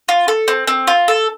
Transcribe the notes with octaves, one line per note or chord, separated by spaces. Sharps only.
F4
A4
C4
C4
F4
A4